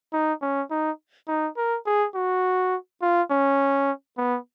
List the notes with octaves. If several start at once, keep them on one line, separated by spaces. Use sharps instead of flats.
D#4
C#4
D#4
D#4
A#4
G#4
F#4
F4
C#4
B3